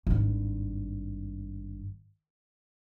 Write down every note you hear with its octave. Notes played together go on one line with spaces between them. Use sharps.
G#1 G2